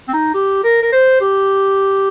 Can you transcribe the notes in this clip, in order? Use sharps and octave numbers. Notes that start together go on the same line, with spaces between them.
C4
D#4
G4
A#4
A#4
C5
G4